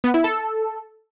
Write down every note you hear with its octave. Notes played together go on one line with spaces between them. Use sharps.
B3
E4
A4